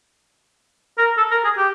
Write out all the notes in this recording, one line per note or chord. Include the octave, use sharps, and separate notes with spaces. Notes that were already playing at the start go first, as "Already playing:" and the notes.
A#4
A4
A#4
G#4
G4